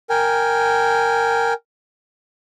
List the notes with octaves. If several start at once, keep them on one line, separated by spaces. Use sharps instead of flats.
A#4 G5 G#5